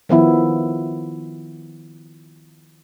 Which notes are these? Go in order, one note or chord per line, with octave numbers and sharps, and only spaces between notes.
D#3 F3 B3 E4